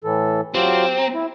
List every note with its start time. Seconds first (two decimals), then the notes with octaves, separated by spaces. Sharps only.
0.04 A2 E3 A4
0.55 F#3 C4 F4 G4
0.99 A#5
1.14 E4